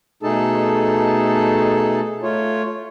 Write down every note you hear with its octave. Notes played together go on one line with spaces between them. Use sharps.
B2 A3 D#4 G#4 A4 A5
A3 F4 C#5